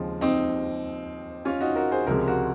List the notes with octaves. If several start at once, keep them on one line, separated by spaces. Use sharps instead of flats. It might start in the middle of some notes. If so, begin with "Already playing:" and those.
Already playing: D#2 C#3 F3 G#3 C4 D#4
C4 D#4
C#4 F4
D#4 F#4
F#4 A#4
G#4 C5
C#2 C3 F3 G#3 F#4 A#4
F#4 A#4